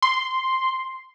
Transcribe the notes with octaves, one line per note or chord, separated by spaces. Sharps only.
C6